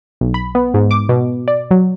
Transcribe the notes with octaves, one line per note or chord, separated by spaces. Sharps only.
B1
B5
B3
G#2
D6
B2
D5
F#3